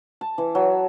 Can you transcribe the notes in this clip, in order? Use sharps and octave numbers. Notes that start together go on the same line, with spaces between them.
A5
E3
F#3